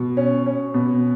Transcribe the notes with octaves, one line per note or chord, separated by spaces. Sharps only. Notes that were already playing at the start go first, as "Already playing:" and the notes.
Already playing: B2
C#4
C#4
B2